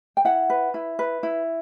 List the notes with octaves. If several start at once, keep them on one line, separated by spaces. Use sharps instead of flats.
G5
E4 F#5
B4
E4
B4
E4